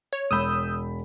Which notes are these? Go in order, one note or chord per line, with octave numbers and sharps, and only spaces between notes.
C#5
E1 B5 D#6 E6 G6